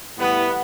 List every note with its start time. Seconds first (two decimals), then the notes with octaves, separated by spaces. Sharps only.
0.17 A2 E3 G3 B3